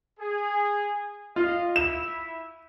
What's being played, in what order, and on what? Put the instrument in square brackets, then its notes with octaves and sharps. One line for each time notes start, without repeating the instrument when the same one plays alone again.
[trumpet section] G#4
[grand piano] F4 [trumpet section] D#5 F5
[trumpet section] E4 E5 [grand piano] E7